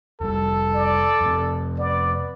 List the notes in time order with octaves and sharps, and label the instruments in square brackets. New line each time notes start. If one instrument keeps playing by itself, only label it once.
[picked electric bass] F1 G3 [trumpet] A4
[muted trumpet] D5
[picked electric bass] F2 C3
[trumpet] B3 [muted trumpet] D5